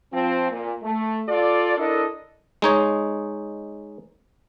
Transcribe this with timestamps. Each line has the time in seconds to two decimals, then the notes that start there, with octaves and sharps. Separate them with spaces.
0.13 F3 C4
0.51 A#2
0.83 A3
1.29 F4 A4 D5
1.77 D4 E4 A4 A#4 D#5
2.62 G#3 D#4 C#5